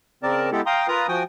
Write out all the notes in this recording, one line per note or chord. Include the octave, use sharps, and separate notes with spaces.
C#3 C4 A#4 D5 A5
G#3 B3 E4 G4 A4
F5 G5 A#5 C6 D#6
F4 A#4 B4 A#5 D#6
F3 F#4 G5 G#5 D#6